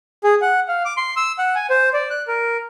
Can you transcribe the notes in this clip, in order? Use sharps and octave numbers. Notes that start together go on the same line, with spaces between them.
G#4
F#5
F5
D6
C6
E6
F#5
G#5
C5
D5
F#6
A#4